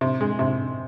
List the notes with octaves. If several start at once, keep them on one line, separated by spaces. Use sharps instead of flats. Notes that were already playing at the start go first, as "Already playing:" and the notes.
C3
G#3
C3